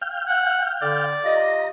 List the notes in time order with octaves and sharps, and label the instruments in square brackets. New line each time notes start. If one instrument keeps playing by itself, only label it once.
[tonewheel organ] F5 G5
[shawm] F#5
[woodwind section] D3 [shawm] D5
[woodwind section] F4 G4 D#5 [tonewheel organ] A#5